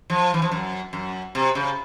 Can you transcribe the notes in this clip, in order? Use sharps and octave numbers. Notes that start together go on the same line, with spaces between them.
F3
E3
F3
F#2
F#2
C3
C#3